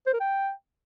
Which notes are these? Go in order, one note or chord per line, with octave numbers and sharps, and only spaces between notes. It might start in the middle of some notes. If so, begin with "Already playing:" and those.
C5
A#4
G5